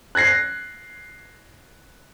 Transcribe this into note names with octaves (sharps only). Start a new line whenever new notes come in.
F#6 G#6 A#6 C7